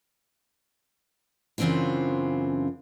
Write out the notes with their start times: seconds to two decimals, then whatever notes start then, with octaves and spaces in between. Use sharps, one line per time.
1.58 F#2 C#3 E3 C4 D4 F4